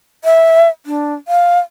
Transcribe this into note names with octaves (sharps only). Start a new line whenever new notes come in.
E5
D4
F5